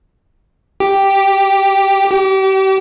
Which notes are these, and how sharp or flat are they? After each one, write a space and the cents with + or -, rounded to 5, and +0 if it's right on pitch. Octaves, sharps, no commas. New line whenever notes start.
G4 +0
G4 -35